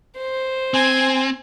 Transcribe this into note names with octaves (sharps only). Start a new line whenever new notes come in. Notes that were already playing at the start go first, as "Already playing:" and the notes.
C5
C4 G#5